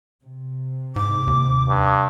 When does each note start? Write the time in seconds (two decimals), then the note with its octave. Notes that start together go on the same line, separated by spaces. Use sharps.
0.23 C3
0.96 G#2 D6
1.27 D#2
1.69 G2